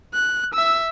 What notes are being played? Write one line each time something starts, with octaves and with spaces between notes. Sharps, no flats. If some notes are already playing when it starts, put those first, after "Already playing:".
F#6
E5 E6